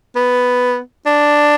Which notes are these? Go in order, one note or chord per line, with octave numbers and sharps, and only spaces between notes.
B3
D4